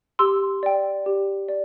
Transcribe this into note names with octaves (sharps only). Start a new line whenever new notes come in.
G4 C6 E6
D5 G5
G4
D5